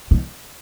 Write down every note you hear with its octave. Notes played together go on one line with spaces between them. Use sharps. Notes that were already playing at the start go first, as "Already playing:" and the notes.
D#3